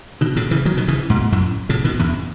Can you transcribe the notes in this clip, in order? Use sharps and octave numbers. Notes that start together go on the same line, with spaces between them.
B2 D#3
A2 C#3
C#3 E3
D#3 F#3
B2 D#3
C#3 E3
G#2 B2
F#2 A2
A2 C#3
B2 D#3
E2 G#2